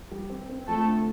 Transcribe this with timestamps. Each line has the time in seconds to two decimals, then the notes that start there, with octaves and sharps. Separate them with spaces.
0.11 G3
0.30 C4
0.49 C4
0.67 F3 A3 A4
0.86 D3